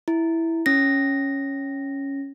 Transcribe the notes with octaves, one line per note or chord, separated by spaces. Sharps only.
E4
C#4 A#6